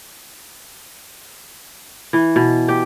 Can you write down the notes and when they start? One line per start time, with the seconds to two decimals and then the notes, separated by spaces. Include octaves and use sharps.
2.13 E3
2.36 B2
2.68 G4